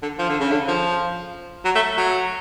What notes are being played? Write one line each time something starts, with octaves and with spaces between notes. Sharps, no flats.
D3
F3
D3
C#3
D3
F3
F#3
A3
F#3